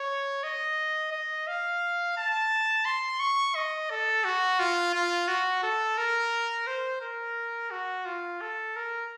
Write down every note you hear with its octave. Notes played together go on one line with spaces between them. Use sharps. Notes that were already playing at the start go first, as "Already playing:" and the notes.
Already playing: C#5
D#5
D#5
F5
A5
C6
C#6
D#5
A4
F#4
F4
F4
F#4
A4
A#4
C5
A#4
F#4
F4
A4
A#4